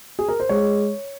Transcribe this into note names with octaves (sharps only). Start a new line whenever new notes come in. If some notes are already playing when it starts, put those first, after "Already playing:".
G#4
A#4
C5
G#3 C#5